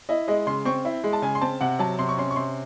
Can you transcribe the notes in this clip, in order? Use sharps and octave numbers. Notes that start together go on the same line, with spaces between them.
E4 D#5
G#3 D#5
C#3 C6
C4 C#6
E4
G#3
A5
C#3 G#5
C6
C4 A5
C3 F#5
F#3 A5
C3 C6
C#6
C#4 C6
C#6
C3 C6